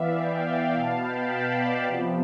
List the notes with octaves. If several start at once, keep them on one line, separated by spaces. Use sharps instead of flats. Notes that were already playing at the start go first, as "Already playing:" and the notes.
Already playing: E3 B3 D5 E5 F5
E5 G5
D5 F5
B2 B3 F5 A5
G5 B5
F5 A5
D5 F5
C3 F3 B3